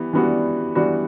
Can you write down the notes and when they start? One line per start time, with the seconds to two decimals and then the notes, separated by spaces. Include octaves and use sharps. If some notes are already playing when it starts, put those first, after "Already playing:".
Already playing: E3 G3 B3
0.13 E3 G3 B3 D4 F#4
0.75 E3 G3 B3 D4 F#4